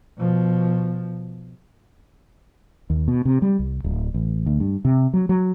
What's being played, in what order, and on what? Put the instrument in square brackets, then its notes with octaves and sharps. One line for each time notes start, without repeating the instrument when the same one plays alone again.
[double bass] B2 F3
[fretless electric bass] D#2
B2
C3
G3
C2
D1
A1
D2
G2
C3
F#3
F#3